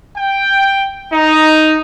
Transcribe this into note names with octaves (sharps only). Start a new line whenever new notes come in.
G5
D#4